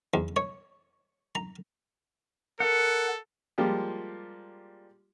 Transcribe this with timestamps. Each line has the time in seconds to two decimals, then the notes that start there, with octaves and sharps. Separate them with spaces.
0.14 E2
0.36 C#5
1.35 A#5
2.60 A4 A#4 F#5
3.58 F3 G3 G#3 A#3 F4 G4